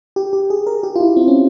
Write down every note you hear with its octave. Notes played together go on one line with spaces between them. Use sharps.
G4
G4
G#4
A#4
G4
F4
E4
C4
C#4